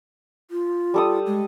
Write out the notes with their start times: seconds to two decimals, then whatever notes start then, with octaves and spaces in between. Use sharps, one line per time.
0.51 F4
0.94 G3 A4 D#6
1.26 G#3